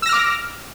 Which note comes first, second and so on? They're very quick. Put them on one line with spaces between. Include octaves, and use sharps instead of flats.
E6 A#6 F6 D6